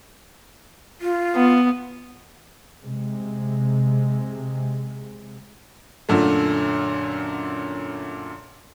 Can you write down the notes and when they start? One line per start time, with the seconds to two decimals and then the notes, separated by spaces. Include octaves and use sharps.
1.01 F4
1.35 B3
2.82 C3 G#3
6.09 F#2 A#2 D3 A3